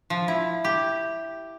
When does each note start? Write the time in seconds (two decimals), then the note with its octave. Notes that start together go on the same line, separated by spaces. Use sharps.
0.10 F3
0.28 E4
0.64 G4